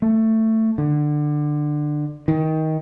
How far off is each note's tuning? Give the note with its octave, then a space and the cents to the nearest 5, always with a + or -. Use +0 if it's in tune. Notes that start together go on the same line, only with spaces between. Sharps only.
A3 +15
D3 +20
D#3 +20